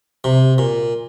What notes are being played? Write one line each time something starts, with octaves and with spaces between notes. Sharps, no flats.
C3
A#2